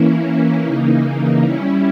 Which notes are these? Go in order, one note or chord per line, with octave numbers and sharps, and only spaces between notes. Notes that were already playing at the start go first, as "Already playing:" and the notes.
Already playing: E3 A#3 C#4 E4
C#3 E3 A#3 D#4
G3 C#4 E4